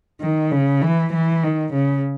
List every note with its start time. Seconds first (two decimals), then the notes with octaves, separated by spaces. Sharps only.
0.21 D#3
0.52 C#3
0.82 E3
1.13 E3
1.43 D#3
1.73 C#3